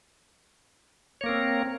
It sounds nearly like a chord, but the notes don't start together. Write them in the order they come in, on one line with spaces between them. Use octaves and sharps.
C#5 A#3 A#4 C4